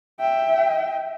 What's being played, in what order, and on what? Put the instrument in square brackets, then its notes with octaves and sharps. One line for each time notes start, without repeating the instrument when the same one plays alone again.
[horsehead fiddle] E5 G5